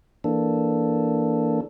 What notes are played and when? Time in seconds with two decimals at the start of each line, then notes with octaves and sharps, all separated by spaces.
0.24 E3 A#3 D4 A4